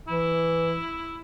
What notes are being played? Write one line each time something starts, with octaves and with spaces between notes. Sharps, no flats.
E3 E4